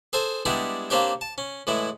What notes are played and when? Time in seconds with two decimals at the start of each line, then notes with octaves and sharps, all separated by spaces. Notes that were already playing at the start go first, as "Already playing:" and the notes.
0.13 G#4 A4 C5 G#5
0.45 G3 G#3 B3 D4 E4 G4
0.90 A#3 C4 D4 G4 C#5 G5
1.21 A5
1.38 C#4
1.67 A2 E3 G#3 E4